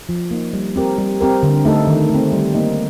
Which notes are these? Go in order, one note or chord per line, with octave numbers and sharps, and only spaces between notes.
F3
A#3 D#4
G3
C4 G4 A#4
G3
C4 G4 A#4
D3
A3 D#4 A4
D#3
A3 C4
G3
A#3 D#4